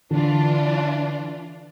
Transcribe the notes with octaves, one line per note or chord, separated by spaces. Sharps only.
D3 E3 D4 F4